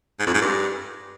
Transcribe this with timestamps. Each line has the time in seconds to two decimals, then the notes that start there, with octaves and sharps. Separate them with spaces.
0.19 G#2
0.27 F2
0.34 G#2
0.41 G2